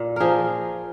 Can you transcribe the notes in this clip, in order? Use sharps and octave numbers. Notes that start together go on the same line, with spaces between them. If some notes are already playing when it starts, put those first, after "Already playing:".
Already playing: A#2
F3 G#4 A#4